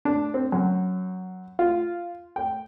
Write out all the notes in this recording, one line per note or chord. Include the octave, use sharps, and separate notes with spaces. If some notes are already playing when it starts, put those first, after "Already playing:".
D4
C4
F#2
F4
G5